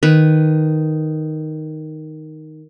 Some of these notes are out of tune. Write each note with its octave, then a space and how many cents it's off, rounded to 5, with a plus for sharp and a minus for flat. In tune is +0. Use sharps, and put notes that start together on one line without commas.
D#3 +0 B4 +0